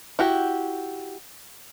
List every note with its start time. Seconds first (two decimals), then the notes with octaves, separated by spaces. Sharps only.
0.19 E4 F#4 G4